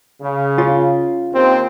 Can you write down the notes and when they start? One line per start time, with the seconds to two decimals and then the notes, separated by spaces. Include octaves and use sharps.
0.21 C#3
0.58 C#4 F4
1.33 D#2 C4